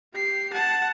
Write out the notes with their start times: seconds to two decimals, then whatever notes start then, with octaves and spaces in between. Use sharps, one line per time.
0.13 G4 C7
0.53 F#5 A5